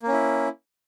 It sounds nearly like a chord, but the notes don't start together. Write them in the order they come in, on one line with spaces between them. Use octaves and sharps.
A#3 C#4 E4